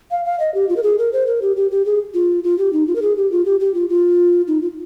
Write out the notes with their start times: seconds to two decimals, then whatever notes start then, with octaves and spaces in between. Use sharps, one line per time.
0.11 F5
0.25 F5
0.39 D#5
0.54 G4
0.69 F4
0.76 A#4
0.83 G#4
0.98 A#4
1.13 C5
1.27 A#4
1.42 G4
1.56 G4
1.71 G4
1.86 G#4
2.14 F4
2.44 F4
2.58 G4
2.73 D#4
2.87 F4
2.95 A#4
3.02 G#4
3.17 G4
3.31 F4
3.45 G4
3.60 G4
3.74 F4
3.89 F4
4.47 D#4
4.62 F4